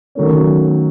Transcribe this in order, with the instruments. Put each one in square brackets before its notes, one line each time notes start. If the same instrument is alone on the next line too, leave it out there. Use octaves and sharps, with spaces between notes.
[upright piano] D#3 F#3 A3 C#4